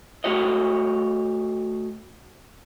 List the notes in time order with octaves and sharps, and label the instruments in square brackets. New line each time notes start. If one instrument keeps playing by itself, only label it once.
[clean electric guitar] A3 F#4 G4 C#5 D#5